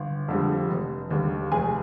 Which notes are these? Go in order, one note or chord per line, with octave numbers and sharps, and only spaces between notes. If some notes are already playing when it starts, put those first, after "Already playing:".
Already playing: G1
F2 D3 G3
F1
D#2 D3 G3
F1 G#4 G#5